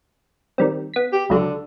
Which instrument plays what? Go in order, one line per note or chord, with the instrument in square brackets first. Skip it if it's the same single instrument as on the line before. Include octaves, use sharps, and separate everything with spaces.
[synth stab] D#3 G3 C4
B3 B6
[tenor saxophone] G4
[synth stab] C#2 F#3 [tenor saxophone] D3